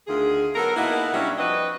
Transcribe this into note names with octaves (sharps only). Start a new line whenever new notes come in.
D2 D#3 F4 G#4
F#3 B3 A4 A#4
B2 A#3 B3 D#4 E4
F#3 G3 C#4 D4 E4
F3 C4 D4 F#4 B4 D#5